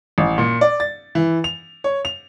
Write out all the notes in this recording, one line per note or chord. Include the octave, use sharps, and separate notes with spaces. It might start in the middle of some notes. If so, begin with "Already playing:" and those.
A1
A#2
D5
A6
E3
F7
C#5
F7